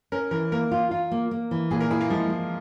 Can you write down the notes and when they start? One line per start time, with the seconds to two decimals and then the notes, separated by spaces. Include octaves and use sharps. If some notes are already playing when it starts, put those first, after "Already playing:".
0.12 C#4 A#4
0.31 E3 A#4
0.52 A#3 A#4
0.71 F4
0.91 F4
1.11 A#3
1.31 A#3
1.51 E3
1.71 A#2 G#4
1.81 A#4
1.90 E4 G#4
2.01 A#3
2.10 F3 G#3
2.30 G#3